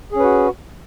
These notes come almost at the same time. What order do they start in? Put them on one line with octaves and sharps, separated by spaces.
G#4 C#4 B4 F#4